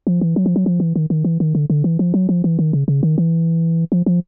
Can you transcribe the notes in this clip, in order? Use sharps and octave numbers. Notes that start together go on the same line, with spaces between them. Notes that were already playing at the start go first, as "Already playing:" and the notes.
F3
E3
F#3
F3
F#3
F3
E3
D#3
D#3
E3
D#3
D3
D3
E3
F3
F#3
F3
E3
D#3
C#3
C#3
D#3
E3
F3
F3